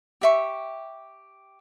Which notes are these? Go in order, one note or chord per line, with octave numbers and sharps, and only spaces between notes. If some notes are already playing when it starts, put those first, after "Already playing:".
G4 E5 C#6